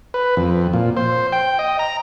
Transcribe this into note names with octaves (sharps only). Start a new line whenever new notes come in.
B4
F2
A#2
C5
G5
D#5
A#5